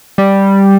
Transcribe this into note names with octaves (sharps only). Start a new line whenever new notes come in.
G3